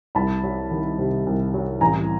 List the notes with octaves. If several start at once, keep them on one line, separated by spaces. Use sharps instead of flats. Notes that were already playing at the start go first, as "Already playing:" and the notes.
C2 A5 B5
F#3
D#3
C3
C2
F#3
A1 G#5 A#5